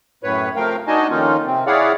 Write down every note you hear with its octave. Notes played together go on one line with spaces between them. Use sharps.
F#2 A2 B4 C#5
C3 F3 A3 A#4 F5 G5
D4 D#4 F#4 D#5 G#5 A5
F2 D#3 A#3 C#4 D#4 F4
C3 C4
E4 G#4 C#5 D5 F5 F#5